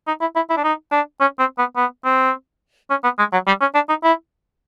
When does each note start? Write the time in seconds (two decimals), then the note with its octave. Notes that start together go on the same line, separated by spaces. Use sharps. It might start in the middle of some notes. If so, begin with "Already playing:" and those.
0.07 D#4
0.21 E4
0.36 E4
0.50 E4
0.57 D4
0.64 D#4
0.92 D4
1.20 C#4
1.39 C4
1.58 B3
1.76 B3
2.05 C4
2.90 C#4
3.04 B3
3.18 G#3
3.32 F#3
3.47 G3
3.61 C#4
3.74 D4
3.89 D#4
4.03 E4